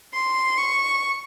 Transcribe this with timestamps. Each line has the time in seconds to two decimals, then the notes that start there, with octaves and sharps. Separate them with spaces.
0.14 C6
0.58 C#6